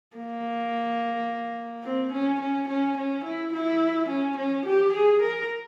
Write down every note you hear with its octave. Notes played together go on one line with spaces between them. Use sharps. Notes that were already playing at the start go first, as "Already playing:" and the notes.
A#3
C4
C#4
C#4
C#4
C#4
E4
E4
C#4
C#4
G4
G#4
A#4